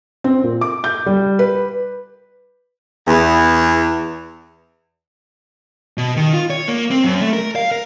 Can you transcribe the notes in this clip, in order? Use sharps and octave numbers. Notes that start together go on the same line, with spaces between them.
C4
A#2
D6
G6
G3
B4
E2
B2
D#3
F4
C#5
A#3
C4
F#2
A3
A#4
F5
A#4